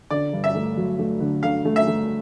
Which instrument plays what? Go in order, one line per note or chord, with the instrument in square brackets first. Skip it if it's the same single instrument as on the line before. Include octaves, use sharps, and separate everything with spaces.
[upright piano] D3 [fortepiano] D5
[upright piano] G2
[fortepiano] E5
[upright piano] A3
F#3
A3
D3
[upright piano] D3 [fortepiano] F5
[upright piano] A3
[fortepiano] E5
[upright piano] A3